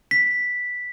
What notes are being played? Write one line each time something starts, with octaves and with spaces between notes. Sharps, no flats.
B6